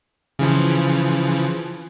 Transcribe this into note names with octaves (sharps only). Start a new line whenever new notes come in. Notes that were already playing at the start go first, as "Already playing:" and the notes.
C#3 E3 F3